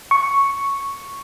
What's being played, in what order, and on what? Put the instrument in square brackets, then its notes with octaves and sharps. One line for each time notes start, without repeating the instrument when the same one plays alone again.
[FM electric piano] C#6